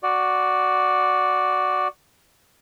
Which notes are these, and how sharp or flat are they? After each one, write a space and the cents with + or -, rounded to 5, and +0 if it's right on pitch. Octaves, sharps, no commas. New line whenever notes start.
F#4 +0 D5 +0